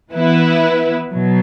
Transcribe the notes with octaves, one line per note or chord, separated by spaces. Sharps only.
E3 B3 E4 B4
B2 F#3